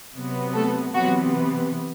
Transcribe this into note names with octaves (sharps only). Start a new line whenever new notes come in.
C3 F#3 B3
A3 A4
C3 E3 F#3 B3 F#4